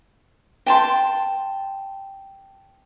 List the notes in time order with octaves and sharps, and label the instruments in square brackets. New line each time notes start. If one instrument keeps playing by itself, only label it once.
[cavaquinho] G5 A5 C6